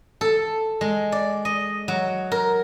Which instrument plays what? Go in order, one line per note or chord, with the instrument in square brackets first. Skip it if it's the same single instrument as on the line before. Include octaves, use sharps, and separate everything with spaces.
[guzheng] A4
G#3
D5
D#5
F#3
A#4